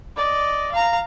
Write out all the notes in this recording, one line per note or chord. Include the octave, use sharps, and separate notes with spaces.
D5 D#5
F5 A#5